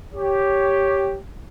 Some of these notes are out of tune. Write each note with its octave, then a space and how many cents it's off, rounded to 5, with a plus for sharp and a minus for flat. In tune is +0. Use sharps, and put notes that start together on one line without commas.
G4 +0 C#5 +0